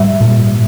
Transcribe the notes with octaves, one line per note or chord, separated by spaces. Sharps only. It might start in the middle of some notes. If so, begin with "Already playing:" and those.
Already playing: G#2 G3 E5
A#2